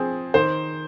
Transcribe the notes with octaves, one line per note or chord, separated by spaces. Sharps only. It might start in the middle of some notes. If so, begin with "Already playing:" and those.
Already playing: F3 C4 G#4
D#3 C5